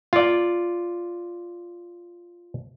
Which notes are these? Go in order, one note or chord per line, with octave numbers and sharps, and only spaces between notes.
F4 D5